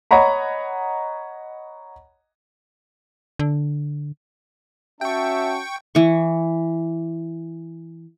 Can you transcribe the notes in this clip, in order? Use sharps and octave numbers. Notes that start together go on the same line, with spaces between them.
C#5 D#5 F#5 A#5 B5
D3
C#4 F#4 E5 G5 A5 C#6
E3 C#6